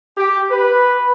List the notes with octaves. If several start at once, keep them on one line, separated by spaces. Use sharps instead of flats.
G4
B4